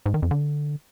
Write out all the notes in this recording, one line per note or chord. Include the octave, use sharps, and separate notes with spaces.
G#2
D#3
F2
D3